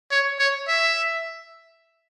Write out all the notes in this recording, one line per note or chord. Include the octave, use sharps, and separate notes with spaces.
C#5
C#5
E5